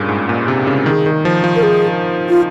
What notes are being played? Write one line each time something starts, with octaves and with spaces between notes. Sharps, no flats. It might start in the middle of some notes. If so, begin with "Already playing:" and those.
Already playing: G2 A#2 C#3
G#2
A#2
C3
C#3
D#3 G#4
D#3
F3
F3
A#4
G#4
F4